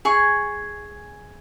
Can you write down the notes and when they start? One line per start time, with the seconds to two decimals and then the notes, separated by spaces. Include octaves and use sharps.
0.05 G#4 G#5 C#6